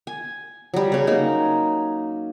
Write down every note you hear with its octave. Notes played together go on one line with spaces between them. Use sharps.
G#5
F#3 G3
C#3 C#4
A#3 D#4